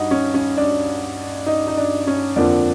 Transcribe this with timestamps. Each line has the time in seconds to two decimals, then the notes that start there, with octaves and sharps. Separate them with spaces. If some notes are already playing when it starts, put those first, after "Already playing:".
Already playing: G2 D#4 F#4
0.11 C#4
0.34 C#4
0.57 D4
1.46 D#4
1.67 D#4
1.77 D4
2.07 C#4
2.36 F2 D3 F3 A#3 D4